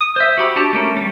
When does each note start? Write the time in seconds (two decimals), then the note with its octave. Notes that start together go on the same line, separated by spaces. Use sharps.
0.01 D#6
0.16 C5 E5
0.38 F#4 G4 B5
0.56 D4 F#4 G4 A5
0.73 A3 A#3 C#4
0.97 G3 A3